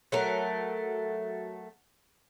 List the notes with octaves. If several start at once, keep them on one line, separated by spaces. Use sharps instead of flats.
F#3 A3 A#4